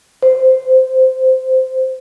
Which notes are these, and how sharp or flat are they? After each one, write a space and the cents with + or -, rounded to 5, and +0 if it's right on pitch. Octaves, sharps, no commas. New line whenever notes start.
C5 -10